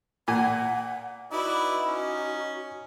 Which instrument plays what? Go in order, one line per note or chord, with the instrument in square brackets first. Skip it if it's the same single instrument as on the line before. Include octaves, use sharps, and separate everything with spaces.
[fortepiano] A#2 G#5 [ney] F#5
[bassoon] D#4 [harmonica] E4 B4 D5 [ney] F#4
[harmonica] C#4